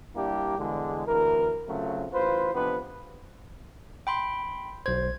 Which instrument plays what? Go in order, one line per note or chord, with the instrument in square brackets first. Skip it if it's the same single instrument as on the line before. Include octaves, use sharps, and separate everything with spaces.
[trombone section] G3 A#3 D4 E4 G4
E2 D3 G#3
D2 E3 A#4
C#3 F#3 A3 C4 F4
A1 F4 B4 C5
F2 C3 B3 D4 B4
[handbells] G5 B5 C6
[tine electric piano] B1 C5 [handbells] G#6